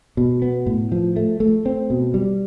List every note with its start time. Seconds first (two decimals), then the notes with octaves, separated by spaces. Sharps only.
0.17 B2
0.42 B3
0.66 A2
0.92 F3
1.16 A3
1.40 A3
1.66 C4
1.90 B2
2.14 G3